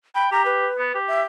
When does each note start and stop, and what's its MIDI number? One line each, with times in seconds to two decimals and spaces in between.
0.15 0.31 79
0.15 0.31 83
0.32 0.67 67
0.32 0.45 82
0.45 0.99 71
0.79 0.91 59
0.95 1.25 67
1.08 1.22 76